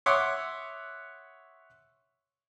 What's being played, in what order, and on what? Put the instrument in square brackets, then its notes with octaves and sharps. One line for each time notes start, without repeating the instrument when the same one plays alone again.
[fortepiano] C#5 E5 F#5 C6 D6 D#6